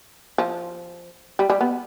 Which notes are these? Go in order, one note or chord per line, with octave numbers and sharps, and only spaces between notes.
F3
G3
G3
B3